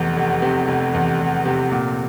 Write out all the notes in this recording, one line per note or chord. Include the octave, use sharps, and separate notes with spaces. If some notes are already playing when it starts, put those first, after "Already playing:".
Already playing: F1 E2
F1
C3
F1
E2
F1
C3
A#2